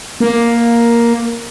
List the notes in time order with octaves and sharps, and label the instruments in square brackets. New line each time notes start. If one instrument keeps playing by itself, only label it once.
[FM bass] A#3